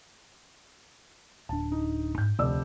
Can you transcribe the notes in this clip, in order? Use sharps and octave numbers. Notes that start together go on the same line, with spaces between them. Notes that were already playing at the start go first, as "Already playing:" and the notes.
D1 D4 A5
D#4
G#2 G6
F1 D2 D5 E6